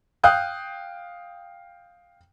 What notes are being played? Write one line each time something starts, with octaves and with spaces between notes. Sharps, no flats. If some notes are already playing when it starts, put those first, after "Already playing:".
F5 G5 D#6 F#6 G6